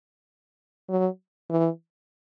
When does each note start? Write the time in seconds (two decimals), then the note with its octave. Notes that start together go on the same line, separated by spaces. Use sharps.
0.89 F#3
1.50 E3